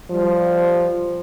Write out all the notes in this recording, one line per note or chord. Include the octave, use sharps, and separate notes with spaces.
F3 G3